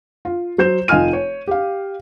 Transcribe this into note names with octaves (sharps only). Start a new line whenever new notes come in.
F4
F#3 C5 G6 E7
F1 F4 D#5 G#5 F6 D#7
C#5
G4 F5